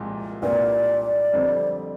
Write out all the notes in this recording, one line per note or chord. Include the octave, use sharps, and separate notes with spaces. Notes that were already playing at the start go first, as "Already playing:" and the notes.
Already playing: C2 A#2 F3 G#3
C2 A#2 G3 A#3 D4 D5
F2 D3 G3 C4